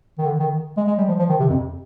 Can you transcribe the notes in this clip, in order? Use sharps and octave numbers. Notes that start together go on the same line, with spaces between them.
D#3
D3
D#3
G#3
G#3
G3
F3
F3
D#3
C3
F2